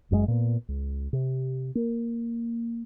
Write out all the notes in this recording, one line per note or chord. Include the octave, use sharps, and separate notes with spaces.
F#1 F#2 B2 G#3
A#2 B3
C#2
C3
A#3